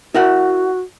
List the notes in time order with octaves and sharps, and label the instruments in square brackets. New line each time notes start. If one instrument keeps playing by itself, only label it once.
[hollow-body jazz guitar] E4 A#4 F#5 [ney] F#4